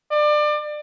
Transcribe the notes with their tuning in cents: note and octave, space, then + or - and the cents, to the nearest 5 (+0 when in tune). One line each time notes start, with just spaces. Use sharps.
D5 +30